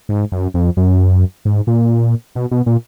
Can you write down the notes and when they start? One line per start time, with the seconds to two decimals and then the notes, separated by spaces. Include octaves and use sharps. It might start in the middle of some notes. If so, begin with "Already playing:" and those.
0.09 G#2
0.32 F#2
0.54 F2
0.77 F#2
1.45 G#2
1.67 A#2
2.35 B2
2.51 B2
2.66 A#2